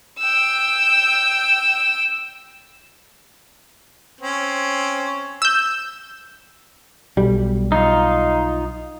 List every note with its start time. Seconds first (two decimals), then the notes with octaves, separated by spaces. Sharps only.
0.18 G5 E6
4.21 C4 C#4
5.42 E6 G6
7.17 B1 G3
7.72 D#4 F4